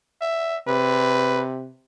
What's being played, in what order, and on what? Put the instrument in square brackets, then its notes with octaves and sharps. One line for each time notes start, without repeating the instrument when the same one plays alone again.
[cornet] E5
[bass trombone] C3 [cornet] B4